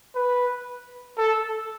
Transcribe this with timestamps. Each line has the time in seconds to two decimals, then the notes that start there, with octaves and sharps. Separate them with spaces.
0.15 B4
1.18 A4